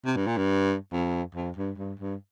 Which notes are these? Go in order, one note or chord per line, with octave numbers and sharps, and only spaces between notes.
C3
G2
A#2
G2
F2
F2
G2
G2
G2